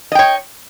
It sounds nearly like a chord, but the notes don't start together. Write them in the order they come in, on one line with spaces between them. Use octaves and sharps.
D#5 G5 C#5